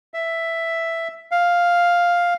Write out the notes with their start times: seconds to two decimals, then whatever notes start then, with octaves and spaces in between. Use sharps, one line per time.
0.14 E5
1.31 F5